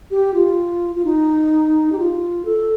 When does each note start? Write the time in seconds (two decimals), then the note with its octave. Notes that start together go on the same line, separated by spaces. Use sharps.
0.11 G4
0.34 F4
0.96 F4
1.05 D#4
1.92 G4
1.98 F4
2.45 A4